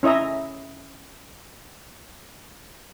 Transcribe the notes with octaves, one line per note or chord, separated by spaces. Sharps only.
C#4 E4 D#5 E5 A#5